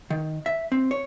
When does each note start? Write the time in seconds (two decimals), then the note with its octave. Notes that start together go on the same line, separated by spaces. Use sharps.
0.10 D#3
0.46 E5
0.72 C4
0.91 C#5